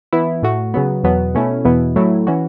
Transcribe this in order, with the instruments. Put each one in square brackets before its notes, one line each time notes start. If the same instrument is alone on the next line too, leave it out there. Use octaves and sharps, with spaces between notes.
[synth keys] E3 B3 E4
A2 A3 F#4
C#3 F#3 B3
E2 B2 F#3 B3
B2 A3 C#4 E4
E2 B2 B3 E4
A2 F#3 A3 E4
E3 C#4 F#4